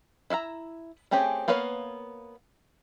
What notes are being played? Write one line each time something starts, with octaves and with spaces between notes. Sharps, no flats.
E4 E5 F5 A#5
A3 C4 C#4 G4 G#4
A#3 B3 B4 C#5 F5